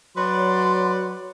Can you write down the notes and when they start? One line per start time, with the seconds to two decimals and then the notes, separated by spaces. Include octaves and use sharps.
0.16 F#3 B4 C#5 D5 C6